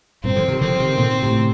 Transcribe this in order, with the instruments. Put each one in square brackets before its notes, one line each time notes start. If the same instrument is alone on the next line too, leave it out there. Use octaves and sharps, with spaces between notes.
[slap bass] G2 A#2 [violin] C4
[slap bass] D3 F3
C3 D#3
[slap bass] D3 F3 [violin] C4
[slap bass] C3 D#3
A#2 D3
A2 C3